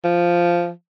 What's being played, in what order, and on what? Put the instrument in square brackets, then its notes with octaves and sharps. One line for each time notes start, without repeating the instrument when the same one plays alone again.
[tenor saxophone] F3